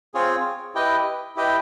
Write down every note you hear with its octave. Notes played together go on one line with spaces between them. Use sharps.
C4 F4 G#4 C#5
E4 G4 B4 D#5 G5
E4 G4 B4 D#5 G5